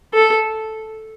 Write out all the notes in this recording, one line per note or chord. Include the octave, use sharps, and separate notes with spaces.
A4